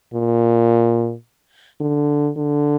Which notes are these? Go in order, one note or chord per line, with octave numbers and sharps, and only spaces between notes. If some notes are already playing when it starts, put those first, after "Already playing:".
A#2
D3
D3